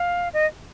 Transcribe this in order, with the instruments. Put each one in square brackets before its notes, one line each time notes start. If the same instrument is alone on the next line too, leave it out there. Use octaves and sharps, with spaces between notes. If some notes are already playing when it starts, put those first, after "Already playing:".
Already playing: [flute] F5
D#5